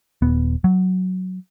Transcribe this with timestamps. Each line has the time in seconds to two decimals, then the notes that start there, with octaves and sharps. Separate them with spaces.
0.22 D#1 B3
0.64 F#3